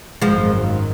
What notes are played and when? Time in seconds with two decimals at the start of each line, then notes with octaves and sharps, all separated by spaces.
0.22 G#1 F#2 D#3 F3 F#3 G#3